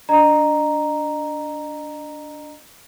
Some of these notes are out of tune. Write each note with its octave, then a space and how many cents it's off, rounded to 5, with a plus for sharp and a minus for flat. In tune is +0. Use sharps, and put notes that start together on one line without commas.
D4 -15 D#5 -35 A#5 +0